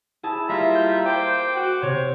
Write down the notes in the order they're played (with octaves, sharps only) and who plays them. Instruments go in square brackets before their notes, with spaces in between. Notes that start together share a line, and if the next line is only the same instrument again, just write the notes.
[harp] E4 G#4 A5
[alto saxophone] G3 [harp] A#3 [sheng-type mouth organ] F4 E5 A#5
[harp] G6
[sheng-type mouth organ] C5 D6 [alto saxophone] G5
[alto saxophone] F#4
[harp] C3 [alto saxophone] C#5